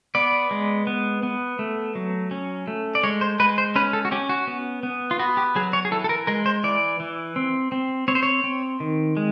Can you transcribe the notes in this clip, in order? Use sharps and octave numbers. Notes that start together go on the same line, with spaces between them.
B3 D5
G#3
B3
B3
A3
F#3
C#4
A3
D5
G#3 C#5
C5
G#3 B4
C5
C#4 B4
A4
F#4
C#4 G4
F#4
B3
B3
F4
B3 F#4
G4
F#3 G#4
C#5
G#4
E3 A4
A4
A#4
G#3 A#4
C5
E3 D5
E3
C4
C4
C4 C#5
C5
C#5
C4
D#3
G#3